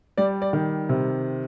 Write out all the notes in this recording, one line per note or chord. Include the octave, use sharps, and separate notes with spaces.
G3 D5
D5
D#3
C3